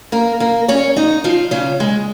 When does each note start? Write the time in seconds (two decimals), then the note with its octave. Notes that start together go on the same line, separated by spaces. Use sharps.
0.12 A#3 A#4
0.40 A#3 A#4
0.68 C#4 C#5
0.96 D#4 D#5
1.24 F3 F4
1.51 C#3 C#4
1.80 G#3